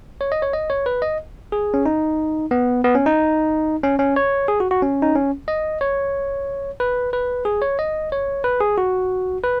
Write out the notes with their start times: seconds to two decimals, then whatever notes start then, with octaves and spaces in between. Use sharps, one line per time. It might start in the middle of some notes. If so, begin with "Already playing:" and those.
0.21 C#5
0.32 D#5
0.42 C#5
0.53 D#5
0.70 C#5
0.86 B4
1.02 D#5
1.52 G#4
1.74 C#4
1.86 D#4
2.51 B3
2.84 B3
2.95 C#4
3.06 D#4
3.84 C#4
3.99 C#4
4.16 C#5
4.48 G#4
4.60 F#4
4.71 F#4
4.82 C#4
5.02 D#4
5.15 C#4
5.48 D#5
5.81 C#5
6.80 B4
7.13 B4
7.45 G#4
7.62 C#5
7.79 D#5
8.12 C#5
8.44 B4
8.61 G#4
8.78 F#4
9.44 B4